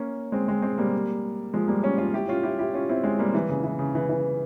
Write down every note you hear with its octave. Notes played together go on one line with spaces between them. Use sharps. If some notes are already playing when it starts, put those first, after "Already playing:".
Already playing: A#3 C#4
G#3 C4
G#3 C4
G#3 C4
G3 A#3
F3 G#3
G3 A#3
A#3 C#4
C#4 F4
E4 G4
C#4 F4
E4 G4
E4 G4
C#4 F4
C4 E4
G#3 C4
G3 A#3
E3
C#3
E3
C#3
E3
E3